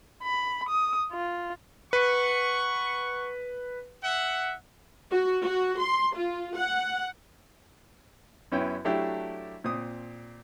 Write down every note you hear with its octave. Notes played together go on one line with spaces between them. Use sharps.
B5
D#6
F4
B4 F#5 C#6
E5 F#5
F#4
F#4
C6
F4
F#5
F#2 B3 C#4 E4 G5
F#3 A3 D4 E4 G4
A#2 C4 D#6